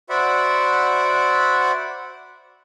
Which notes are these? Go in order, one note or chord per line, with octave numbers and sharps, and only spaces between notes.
F#4 C5 D5 E5 F#5 B5